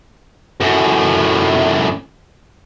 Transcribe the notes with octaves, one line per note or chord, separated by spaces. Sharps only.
F#2 A2